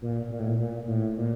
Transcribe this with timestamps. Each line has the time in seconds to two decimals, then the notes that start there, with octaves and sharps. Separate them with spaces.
0.02 A#2
0.31 A#2
0.39 A2
0.48 A#2
0.59 A#2
0.87 A2
1.17 A#2